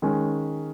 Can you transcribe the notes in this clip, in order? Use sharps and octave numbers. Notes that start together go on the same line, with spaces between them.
D#3 G#3 C#4